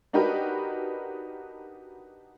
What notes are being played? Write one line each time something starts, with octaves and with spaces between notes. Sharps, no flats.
D4 D#4 F#4 G4 A#4 B4